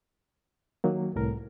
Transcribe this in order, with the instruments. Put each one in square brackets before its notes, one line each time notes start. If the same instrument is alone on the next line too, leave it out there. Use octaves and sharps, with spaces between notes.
[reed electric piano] D#3 F#3 A#3
C2 A2 A#4